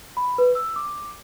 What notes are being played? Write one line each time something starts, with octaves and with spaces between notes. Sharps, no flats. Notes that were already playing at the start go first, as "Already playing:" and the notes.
B5
B4
E6
D6